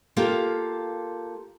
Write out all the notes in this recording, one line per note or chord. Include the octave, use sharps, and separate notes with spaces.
A#3 F4 G4 A4